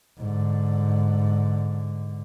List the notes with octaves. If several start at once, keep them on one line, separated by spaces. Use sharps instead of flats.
G#2 D3